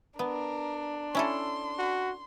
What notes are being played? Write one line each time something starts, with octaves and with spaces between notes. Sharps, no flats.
B3 D4 A#4
C#4 E4 A4 C6
F#4